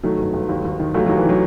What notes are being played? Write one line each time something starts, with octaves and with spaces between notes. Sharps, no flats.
D#3 F#3 A3
G1
G1
D#2
D#2
D#3
D#2 F#3 A3
D#2 F#3
E3
D#3 F#3